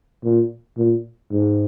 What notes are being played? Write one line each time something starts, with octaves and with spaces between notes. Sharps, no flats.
A#2
A#2
G#2